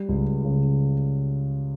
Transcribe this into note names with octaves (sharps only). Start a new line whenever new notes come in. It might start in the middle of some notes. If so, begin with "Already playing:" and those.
Already playing: G3
C#2
C#3